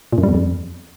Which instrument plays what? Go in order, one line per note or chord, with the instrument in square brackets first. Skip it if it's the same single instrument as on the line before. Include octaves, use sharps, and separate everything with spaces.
[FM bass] A#2
F#2
G3
E2
F2